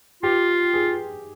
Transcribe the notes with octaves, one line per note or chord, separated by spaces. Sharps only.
F4 G4
G#4